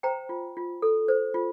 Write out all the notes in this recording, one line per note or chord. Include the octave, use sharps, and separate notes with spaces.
C5 G5 A#5
F4
F4
A4
C5
F4